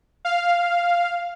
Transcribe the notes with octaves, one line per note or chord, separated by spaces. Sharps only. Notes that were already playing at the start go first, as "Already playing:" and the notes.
F5